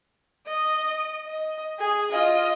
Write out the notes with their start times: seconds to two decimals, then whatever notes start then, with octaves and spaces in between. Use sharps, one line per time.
0.47 D#5
1.25 D#5
1.79 G#4
2.11 F4 D#5